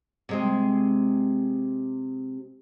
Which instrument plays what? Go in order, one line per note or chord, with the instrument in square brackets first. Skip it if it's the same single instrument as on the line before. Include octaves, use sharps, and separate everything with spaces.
[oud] C3 G#3 C4